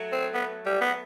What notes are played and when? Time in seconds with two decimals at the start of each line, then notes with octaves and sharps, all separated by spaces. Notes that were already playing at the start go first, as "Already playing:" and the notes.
Already playing: F#3 A3
0.12 C4
0.34 B3
0.66 G3
0.81 B3